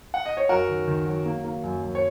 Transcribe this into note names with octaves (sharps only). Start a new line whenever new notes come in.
F#5
D#5
C#5
F#2 F#4 A#4
D#3
D#3
F#3
A#3
A#3
F#2
F#2
C#5